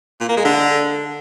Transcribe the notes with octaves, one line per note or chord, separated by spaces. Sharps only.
A#2
A#3
G#3
D3